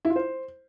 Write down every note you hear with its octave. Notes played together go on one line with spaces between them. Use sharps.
E4
F4
C5